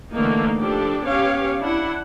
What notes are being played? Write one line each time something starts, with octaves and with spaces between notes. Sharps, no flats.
D3 E3 A3 A#3 D#4
F3 D4 G4 A4
B3 C#4 G4 C#5 F5
D4 E4 F#5